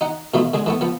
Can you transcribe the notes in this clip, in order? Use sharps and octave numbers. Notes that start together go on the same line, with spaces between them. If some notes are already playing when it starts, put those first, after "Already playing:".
D#4 F#5
B2 E3 A3 F4 B5
D3 G#3 G#4
E3 A3 B3
F3 B3